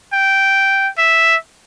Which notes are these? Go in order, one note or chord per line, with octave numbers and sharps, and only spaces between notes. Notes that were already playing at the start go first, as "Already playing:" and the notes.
G5
E5